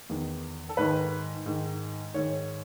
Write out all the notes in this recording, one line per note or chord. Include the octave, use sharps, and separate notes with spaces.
E2 D#3
A4
G#2 D#3 B4
G#2 D#3
G#2 D#3 C#5